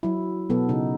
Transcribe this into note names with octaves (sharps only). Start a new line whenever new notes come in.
F#3 E4
B2 F#3 B3 A4
C#3 D#4